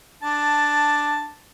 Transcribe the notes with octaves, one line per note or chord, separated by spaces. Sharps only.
D4 A5